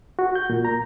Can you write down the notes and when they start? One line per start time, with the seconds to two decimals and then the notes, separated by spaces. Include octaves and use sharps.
0.19 F#4
0.35 G6
0.50 A#2
0.65 A#5